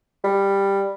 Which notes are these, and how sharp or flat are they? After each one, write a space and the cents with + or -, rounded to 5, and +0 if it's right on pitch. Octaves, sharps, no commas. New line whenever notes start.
G3 +10